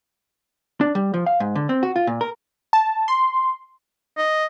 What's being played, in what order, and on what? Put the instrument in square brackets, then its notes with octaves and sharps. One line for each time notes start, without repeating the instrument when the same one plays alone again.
[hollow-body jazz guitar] D4
G3
F3
F5
G#2
D3
C4
F#4
F4
A#2
A#4
[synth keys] A5
C6
[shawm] D#5